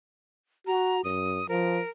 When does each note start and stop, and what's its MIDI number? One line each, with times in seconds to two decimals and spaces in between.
0.67 1.01 66
0.67 1.01 82
1.04 1.42 42
1.04 1.47 87
1.49 1.81 53
1.49 1.89 70